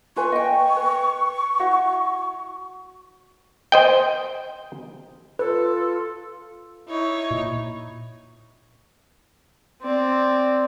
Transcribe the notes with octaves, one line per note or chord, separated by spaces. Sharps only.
F4 B4 G#5 C#6
D#5 G5
B4
E4 F#4 F#5
C5 D#5 G5
F4 A4 B4
D#4 E4 C#5
A#2
C4 D5